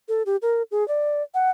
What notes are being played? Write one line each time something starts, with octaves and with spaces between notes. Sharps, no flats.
A4
G4
A#4
G#4
D5
F#5